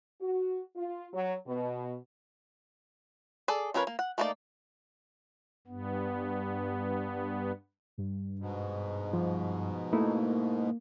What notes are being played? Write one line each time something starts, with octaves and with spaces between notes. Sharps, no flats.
F#4
F4
F#3
B2
G#4 A4 D5
F3 C#4 A#4 B4 C#5
A#3
F#5
A3 A#3 D#4 F#4 D5
G2 B3
G2
G#2 B2
F3
A3 A#3 D#4 E4